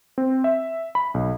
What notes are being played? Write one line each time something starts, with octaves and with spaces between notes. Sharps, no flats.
C4
E5
B5
B1